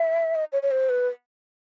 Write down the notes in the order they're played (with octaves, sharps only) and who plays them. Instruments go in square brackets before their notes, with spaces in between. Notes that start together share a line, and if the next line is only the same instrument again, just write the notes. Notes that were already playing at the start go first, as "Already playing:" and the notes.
Already playing: [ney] E5
D#5
C#5
C#5
C5
B4